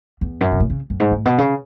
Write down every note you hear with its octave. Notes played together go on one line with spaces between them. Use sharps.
E2
F#2
B2
A2
C#3
F#2
G#2
A2
B2
C#3